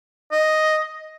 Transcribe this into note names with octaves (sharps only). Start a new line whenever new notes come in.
D#5